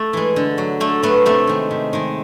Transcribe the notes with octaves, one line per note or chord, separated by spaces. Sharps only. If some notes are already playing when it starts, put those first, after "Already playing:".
Already playing: A3
E3 G#3
D3
F#3
D3 A3
F#3 A3 B3
C3 A3
D#3 G#3
C3
D#3 G#3